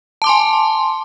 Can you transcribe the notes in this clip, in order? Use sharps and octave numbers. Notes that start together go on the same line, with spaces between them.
G#5 A5 C6 D6